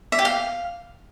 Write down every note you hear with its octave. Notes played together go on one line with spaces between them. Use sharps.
E5
G4
F5